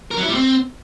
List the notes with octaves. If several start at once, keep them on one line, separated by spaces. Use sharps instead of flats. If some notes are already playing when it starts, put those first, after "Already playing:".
A#4
F#3
E4
G3
C4